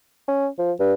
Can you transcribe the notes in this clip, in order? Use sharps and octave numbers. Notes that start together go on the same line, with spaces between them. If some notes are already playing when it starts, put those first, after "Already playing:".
C#4
F3
G2